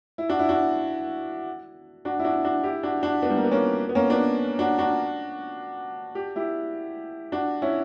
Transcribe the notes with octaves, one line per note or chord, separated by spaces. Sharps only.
E4
D4 F#4
E4
D4 F#4
D4 F#4
E4
D4 F#4
D4 F#4
E4 G4
D4 F#4
D4 F#4
B3 D4
G3
A#3
B3
A#3 C#4
B3
A#3 C#4
B3 D4
D4 F#4
D4 F#4
G4
E4 G4
D4 F#4
C#4 E4